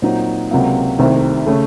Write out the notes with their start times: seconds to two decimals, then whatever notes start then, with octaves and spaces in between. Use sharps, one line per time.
0.02 A#2 F#3 C4 D#4
0.51 C#2 C3 F#3 A#3
0.99 C2 C3 D#3 A3 C4
1.46 C#3 A3